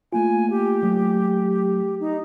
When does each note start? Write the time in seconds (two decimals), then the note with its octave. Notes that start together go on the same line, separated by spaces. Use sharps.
0.13 A3 A#3 F4 G#5
0.50 G4
0.83 F#3 A3
2.00 D#4